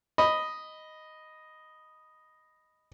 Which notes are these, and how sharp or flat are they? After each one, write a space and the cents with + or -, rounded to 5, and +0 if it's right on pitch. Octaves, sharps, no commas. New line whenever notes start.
D#5 +0 B5 +0